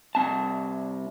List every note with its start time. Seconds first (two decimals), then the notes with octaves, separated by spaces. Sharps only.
0.15 C2 F#3 C4 A5